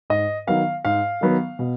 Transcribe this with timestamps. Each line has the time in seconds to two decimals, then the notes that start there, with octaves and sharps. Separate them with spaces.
0.10 G#2 D#5
0.47 D#3 F#3 B3 F5
0.85 G#2 F5
1.21 D#3 F#3 B3
1.59 B2